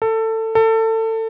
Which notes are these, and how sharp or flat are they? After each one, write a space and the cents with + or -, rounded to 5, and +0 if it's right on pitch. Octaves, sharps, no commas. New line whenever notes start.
A4 +20
A4 +25